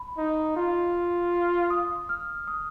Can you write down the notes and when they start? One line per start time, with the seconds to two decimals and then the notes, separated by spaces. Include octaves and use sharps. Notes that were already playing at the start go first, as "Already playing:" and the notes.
Already playing: B5
0.18 D#4
0.56 F4
1.70 D#6
2.09 F6
2.48 D#6